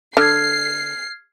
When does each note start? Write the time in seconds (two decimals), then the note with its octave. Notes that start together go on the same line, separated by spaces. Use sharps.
0.17 D3 F6 G#6 C7